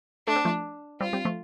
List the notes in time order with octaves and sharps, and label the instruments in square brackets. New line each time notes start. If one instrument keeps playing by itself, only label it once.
[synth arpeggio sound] A3 [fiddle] D4
[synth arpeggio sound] C4
F3 A3
[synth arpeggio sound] G3 C4 [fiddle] F4
[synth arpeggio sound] G3 C4
F3 A3